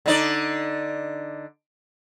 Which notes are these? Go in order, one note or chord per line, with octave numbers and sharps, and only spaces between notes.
D3 D#4 D5